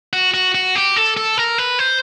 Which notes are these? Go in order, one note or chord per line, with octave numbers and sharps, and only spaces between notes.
F#4
F#4
F#4
G4
A4
A4
A#4
B4
C5